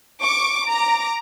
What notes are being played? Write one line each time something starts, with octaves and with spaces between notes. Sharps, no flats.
C#6 D6
A#5 D6